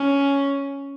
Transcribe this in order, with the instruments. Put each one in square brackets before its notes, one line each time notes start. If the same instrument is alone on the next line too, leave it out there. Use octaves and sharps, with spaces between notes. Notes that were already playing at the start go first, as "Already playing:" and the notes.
Already playing: [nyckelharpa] C#4